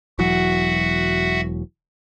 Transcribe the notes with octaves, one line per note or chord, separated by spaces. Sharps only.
E1 E3 F#3 F#4 E5 F#5